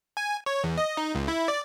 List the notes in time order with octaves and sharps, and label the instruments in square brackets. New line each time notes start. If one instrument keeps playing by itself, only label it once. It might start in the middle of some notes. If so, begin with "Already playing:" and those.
[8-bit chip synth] G#5
C#5
E2
D#5
D#4
C#2
E4
D5